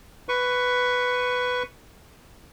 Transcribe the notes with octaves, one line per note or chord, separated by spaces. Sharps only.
B4 C#6